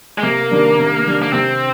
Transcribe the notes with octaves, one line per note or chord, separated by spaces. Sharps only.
G#3
C3 A#3
D#3 G3 D4
C3
D#3 G3 D4
A#3
C3 C4